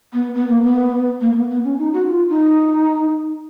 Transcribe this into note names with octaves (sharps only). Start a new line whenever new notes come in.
B3
B3
A#3
B3
A#3
B3
B3
C#4
D#4
F#4
F4
D#4